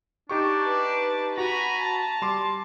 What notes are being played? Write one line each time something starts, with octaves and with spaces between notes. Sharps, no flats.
D4 D#4 G4 C#6
B4 A5
F#4 G#5 A#5 B5
A5
G3 C6 D6